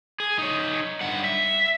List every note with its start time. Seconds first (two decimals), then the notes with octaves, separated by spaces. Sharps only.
0.20 G#4
0.38 D#4 C#5
1.01 G2 F#5
1.24 E5